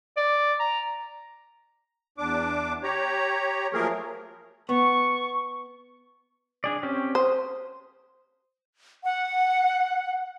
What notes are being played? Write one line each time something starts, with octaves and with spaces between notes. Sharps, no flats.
D5
A#5
E2 D4 D6
G4 C#5 A#5
F3 F#3 A3 A#3 G#4 A#4
B3 C#6
D4 G#4 D5
C4 C#4 G4
C5 D#6
F#5